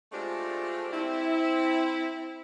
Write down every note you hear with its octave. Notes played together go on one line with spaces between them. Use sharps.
G#3 A3 C4 D4 F4 G4
C4 E4